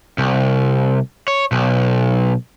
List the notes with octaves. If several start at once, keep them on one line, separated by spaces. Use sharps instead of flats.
C2
C#5
B1